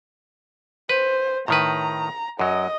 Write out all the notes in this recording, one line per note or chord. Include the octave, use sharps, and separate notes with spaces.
B4 C5
A2 D#3 B4 A#5
F#2 F#3 D#5